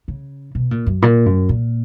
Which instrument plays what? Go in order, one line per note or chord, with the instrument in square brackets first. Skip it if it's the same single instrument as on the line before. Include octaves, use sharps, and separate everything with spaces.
[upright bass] C#3
B2
A#2
F#2
A#2
F#2
A#2